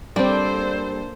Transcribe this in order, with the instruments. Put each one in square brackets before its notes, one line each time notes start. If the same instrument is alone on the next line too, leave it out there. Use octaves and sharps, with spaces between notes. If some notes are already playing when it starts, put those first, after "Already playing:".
[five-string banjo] G3 C4 [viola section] A#3 A4 C5 [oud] D4